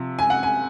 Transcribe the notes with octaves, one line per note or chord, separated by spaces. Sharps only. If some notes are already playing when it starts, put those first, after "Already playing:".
Already playing: C3 F3
G#5
F#5
G#5